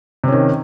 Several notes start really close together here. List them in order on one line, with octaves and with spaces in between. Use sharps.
C3 C#4 D#3